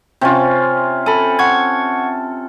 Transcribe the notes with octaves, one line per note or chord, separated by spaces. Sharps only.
C3 C#4 F4
A4 G#5 B5
F#5 C#6 G#6